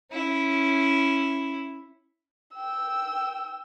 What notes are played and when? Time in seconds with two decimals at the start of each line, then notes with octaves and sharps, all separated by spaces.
0.12 C#4 E4
2.55 G5 E6